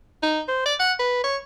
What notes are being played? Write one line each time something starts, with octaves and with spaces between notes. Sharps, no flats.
D#4
C5
D5
F#5
B4
C#5